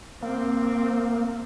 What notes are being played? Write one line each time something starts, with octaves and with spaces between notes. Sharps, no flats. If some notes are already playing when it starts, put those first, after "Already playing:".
A#3 C4